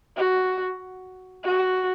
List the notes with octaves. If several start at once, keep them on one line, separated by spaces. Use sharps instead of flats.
F#4
F#4